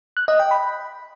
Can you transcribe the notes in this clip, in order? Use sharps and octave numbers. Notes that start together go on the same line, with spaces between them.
F#6
D#5
G5
B5